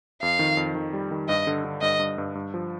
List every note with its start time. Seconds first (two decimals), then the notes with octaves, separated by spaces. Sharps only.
0.22 F2 F5
0.39 D#3
0.57 F2
0.75 D#3
0.93 G3
1.11 D#3
1.28 G2 D#5
1.47 D3
1.65 D3
1.82 G2 D#5
1.99 G2
2.18 G2
2.35 G2
2.54 F3